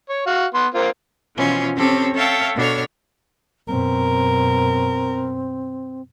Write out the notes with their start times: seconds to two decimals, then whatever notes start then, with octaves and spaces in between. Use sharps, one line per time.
0.09 C#5
0.27 F#4 F5
0.54 B3 C6
0.74 A#3 C4 F4
1.37 B2 E3 F3 C#4 F4
1.76 C4 C#4 G4 A4 C#5
2.14 A4 C#5 E5 F5 G5 A5
2.56 B2 D4 A4 C#5 F6
3.68 F#2 B2 C4 A#4